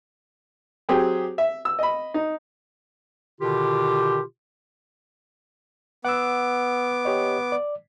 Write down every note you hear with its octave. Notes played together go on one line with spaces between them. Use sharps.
F#3 C4 G4 G#4
E5
E6
D#5 B5
D#4
B2 D3 D#3 F4 G4
B3 F#5 D6 E6
G4 C#5 D#5
D5